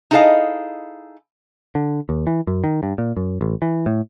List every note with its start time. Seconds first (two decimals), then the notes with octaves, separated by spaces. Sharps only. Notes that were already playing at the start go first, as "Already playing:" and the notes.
0.11 D#4 E4 G#4 A4 D#5 F5
1.75 D3
2.09 D#2
2.27 E3
2.47 F#2
2.64 D#3
2.83 G2
2.98 A#2
3.17 F#2
3.41 A1
3.62 E3
3.86 A2